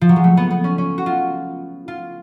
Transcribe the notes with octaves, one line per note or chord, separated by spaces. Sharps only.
F3
F#3
G#3
A3
B3
B3
C#4
C#4
F#4
F4
F4